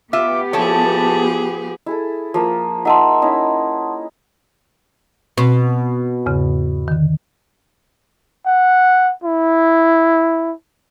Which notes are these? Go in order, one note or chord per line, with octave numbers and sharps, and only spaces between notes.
B3 F4 G4 E5 D6
F3 E4 G#4 A4 C#5 A5
E4 G#4 A4
F3 A#3 E5
D#4 E5 F#5 A5 C6
C#4 D#4 E4
B2 C4
E2 G#2 C#3
D3 D#3
F#5
E4